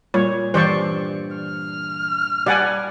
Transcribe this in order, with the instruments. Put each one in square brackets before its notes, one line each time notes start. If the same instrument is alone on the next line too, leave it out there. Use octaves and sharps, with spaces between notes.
[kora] A#2 [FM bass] G3 [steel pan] C#5
[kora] G2 G5 [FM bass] E3 [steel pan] C5 D5 C#6
[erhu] F6
[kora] G3 [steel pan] D5 F#5 G#5